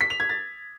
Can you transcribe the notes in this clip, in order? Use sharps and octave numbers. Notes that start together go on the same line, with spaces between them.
B6
F7
G#6
A6